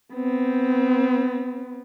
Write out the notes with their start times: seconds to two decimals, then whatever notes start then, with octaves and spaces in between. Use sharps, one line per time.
0.14 B3 C4